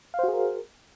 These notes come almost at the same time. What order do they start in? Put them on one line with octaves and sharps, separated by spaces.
F5 C5 F#4 G#4 A#4